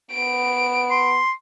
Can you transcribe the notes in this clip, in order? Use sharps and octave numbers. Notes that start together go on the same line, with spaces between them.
B3 D7
C6